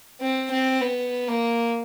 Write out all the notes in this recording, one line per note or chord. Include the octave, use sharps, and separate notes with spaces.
C4
C4
B3
A#3